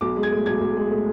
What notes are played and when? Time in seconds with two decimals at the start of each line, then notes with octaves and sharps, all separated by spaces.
0.01 B1 D6
0.16 G#3
0.23 G#6
0.31 A2
0.46 B1 G#6
0.61 B1
0.76 G#3
0.91 A2